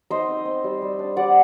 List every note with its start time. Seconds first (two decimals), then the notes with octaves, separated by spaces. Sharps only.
0.10 D#4 C5 D#5
0.28 C4
0.46 C4
0.64 G3
0.82 G3
0.99 D4
1.16 G3 D5 F#5